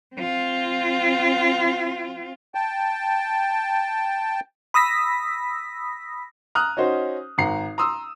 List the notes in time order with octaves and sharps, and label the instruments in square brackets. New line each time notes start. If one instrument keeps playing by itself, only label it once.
[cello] C4 F4
[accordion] G5 A5
[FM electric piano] B5 D#6 E6 A#6 B6
[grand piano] A#5 D#6 F6 F#6
C#4 D#4 F#4 C5
G#1 F#5 A#5 C7
A#5 C6 D#6 E6